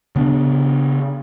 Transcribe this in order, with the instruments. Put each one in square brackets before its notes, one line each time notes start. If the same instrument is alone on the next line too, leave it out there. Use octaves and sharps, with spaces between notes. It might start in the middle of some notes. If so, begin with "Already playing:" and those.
[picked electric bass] C#3 B3 D4